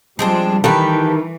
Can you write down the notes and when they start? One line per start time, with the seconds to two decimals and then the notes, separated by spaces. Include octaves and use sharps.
0.19 F3 G3 G#3 C4 D4
0.64 D#3 E3 G4 A4 B4